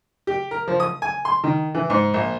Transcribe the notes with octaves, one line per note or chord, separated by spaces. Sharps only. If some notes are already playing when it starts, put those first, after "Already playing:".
G4
A#4
F3
D#6
G#5
C6
D#3
E3
G#2
A#1